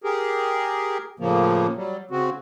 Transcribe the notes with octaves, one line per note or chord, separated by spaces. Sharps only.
G4 G#4 A#4
A2 C#3 F3 A#3
F#3 G3
C#3 C4 F#4